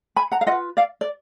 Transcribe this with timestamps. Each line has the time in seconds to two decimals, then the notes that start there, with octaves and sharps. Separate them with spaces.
0.16 G#5 B5
0.32 F#5 A#5
0.41 F5
0.47 F4 D#5 F#5
0.51 B4
0.77 D5 F5
1.01 D5